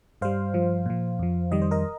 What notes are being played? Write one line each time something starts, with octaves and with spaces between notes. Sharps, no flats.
G2 G3 C5 F5
G2 F3
A#2 F3
F2 F3
F2 D#3 G3 D#5
C5
A#4 D#5